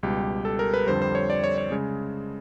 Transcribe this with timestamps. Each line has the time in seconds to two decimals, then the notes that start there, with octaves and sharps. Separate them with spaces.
0.03 C#2 B2 G3 G4
0.45 A4
0.59 A#4
0.74 B4
0.87 F2 D3 G3 C5
1.02 C5
1.15 C#5
1.30 D5
1.44 C#5
1.58 C#5
1.71 C#3 G#3